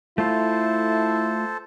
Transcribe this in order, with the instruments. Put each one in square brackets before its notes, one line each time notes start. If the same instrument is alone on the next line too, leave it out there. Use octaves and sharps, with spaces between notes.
[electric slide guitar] A3 F4 [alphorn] E4 [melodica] A4 C5 A5